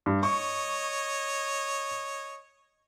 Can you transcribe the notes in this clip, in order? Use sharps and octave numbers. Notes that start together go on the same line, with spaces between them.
G2
C#5 D#5 C#6